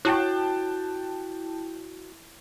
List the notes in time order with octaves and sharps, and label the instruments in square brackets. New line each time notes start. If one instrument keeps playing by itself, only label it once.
[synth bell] E4 [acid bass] F#4 [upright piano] G5 A5 F#6